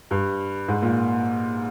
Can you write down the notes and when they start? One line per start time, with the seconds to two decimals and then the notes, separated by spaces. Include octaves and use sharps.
0.11 G2
0.68 G#2
0.82 A#2